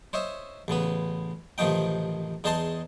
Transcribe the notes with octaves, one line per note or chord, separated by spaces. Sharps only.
C5 C#5 D#5 E5
A1 C#3 B3 B4
A1 C3 D#3 F3 D#4 G5
E2 D#4 G#4 D#5 A5 C6